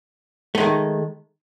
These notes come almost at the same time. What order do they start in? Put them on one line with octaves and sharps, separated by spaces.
A3 G#3 D#3